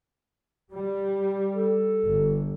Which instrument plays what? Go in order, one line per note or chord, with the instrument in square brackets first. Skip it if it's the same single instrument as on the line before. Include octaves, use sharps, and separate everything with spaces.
[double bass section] G3
[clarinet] A4
[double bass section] G1